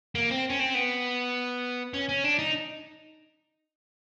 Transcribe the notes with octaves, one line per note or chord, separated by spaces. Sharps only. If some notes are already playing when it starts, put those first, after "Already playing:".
A#3
C4
C#4
C4
B3
C#4
C#4
D4
D#4